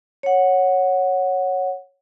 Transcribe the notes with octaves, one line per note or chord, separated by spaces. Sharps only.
C#5 F#5